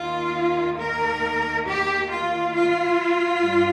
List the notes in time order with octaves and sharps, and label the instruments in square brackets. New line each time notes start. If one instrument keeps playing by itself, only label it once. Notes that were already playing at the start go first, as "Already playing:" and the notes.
Already playing: [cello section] D#2 D#3 A#3 F4
A#4
G4
F4
F4
G2 G3